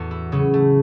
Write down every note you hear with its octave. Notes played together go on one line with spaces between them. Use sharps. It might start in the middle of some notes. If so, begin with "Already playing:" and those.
Already playing: E2 A2 F#4 A4
E4
C#3 F#3 C#4
A3